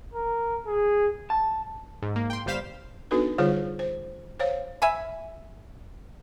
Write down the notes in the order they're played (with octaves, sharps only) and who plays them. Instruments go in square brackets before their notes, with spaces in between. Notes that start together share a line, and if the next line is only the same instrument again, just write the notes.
[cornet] A#4
G#4
[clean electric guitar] A5
[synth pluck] G#2
A#3
G5 C6
G1 G3 C5 F5 B6 E7
[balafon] B3 D4 D#4 F#4 A4 B4
D3 G3 F4 G#4 C5 C#5
C5
C5 C#5 F5
[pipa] E5 G#5 B5